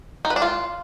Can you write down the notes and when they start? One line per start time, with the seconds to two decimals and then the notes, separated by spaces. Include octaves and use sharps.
0.25 D#4
0.30 B4
0.36 D4
0.42 F4